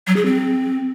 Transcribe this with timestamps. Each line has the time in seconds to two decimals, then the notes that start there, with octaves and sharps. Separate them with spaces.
0.07 F#3
0.16 G#4
0.26 C4